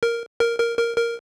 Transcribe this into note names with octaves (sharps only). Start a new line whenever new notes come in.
A#4
A#4
A#4
A#4
A#4